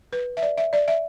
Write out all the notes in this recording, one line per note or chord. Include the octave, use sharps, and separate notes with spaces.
B4
E5
D5
E5
D5
E5